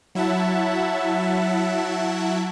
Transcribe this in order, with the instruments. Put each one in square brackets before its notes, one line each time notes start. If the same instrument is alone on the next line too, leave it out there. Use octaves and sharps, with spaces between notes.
[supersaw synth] F#3 E4 E5 F#5 A5